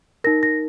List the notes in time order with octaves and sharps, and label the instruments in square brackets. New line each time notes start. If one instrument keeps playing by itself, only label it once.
[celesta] D#4 A#4 A#6
A#6